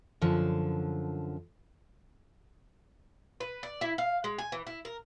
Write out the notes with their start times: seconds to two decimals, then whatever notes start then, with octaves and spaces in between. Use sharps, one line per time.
0.21 F#2 D3 F3 A5
3.40 B4
3.63 D5
3.81 E4
3.98 F5
4.24 G#3
4.38 G#5
4.52 E3
4.67 E4
4.85 A#4